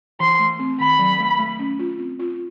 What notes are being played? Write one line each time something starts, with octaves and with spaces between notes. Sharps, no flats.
E3 C6
A3
C4
D#3 B5
F#3
A3
A3
C#4
F4
C4
F4